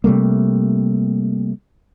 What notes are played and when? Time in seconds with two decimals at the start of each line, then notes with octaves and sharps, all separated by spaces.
0.04 C3 G3 A3 A#3